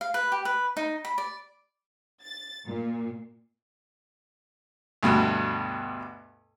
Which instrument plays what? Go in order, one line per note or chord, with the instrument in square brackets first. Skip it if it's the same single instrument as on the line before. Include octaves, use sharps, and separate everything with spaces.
[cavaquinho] F5
B4
G4
B4
D#4
B5
D5
[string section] A6
A#2
[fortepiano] D2 G2 B2